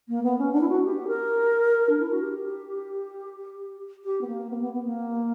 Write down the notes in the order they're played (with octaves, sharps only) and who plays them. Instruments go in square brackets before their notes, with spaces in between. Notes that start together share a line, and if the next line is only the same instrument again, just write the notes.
[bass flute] A#3
B3
C#4
D4
E4
F#4
G4
A#4
D4
E4
F#4
G4
G4
B3
A#3
B3
A#3
B3
B3
A#3